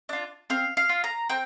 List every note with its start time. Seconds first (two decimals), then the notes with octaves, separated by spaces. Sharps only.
0.09 D4 F4
0.50 C4 F5
0.77 F5
0.89 F4
1.04 A#5
1.29 C4 G5